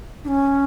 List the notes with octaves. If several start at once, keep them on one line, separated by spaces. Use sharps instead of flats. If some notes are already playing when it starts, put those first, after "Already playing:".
D4
C#4